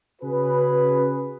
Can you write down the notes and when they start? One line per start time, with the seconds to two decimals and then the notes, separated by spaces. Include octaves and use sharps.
0.22 C#3 C#4 F#4 G#4 B4